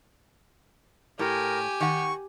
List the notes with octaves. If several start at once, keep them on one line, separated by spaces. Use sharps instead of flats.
A2 G4 A#4 G#5
D#3 F#5 C#6